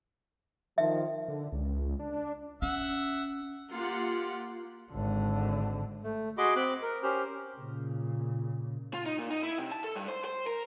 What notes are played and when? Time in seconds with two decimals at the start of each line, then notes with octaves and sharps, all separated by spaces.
0.78 D#3 F3 E5
1.28 D3
1.52 C#2
1.99 D4
2.62 C#4 E5 F#5
3.71 A#3 F4 G4 F#5
4.92 G#1 D3
6.04 A3
6.38 F#4 G#4 D#5 B5 C6 D6
6.56 C4 B5 D6 F#6
6.82 A#4
7.03 C#4 G4 C5 F6
7.58 A#2 C#3
8.94 F4
9.06 D#4
9.19 A#2
9.30 D#4
9.43 E4
9.58 C3
9.71 A5
9.84 A4
9.96 G2
10.08 C5
10.25 C5
10.47 A#4